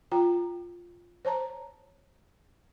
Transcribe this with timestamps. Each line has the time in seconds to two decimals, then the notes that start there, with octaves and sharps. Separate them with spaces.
0.12 F4 G5 A#5
1.25 C5 C#5 A5 A#5